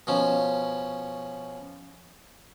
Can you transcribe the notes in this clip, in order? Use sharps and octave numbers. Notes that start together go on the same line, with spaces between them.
B2 F3 C#4